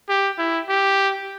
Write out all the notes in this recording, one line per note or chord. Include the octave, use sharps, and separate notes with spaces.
G4
E4
G4